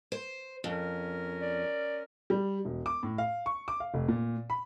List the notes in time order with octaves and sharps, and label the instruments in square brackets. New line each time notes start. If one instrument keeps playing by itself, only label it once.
[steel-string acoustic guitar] C5
[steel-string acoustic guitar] F2 [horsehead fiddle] C#4 A#4
[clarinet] D5
[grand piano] G3
E1
D6
A2
F5
C#6
D6
F5
F1
A#2
B5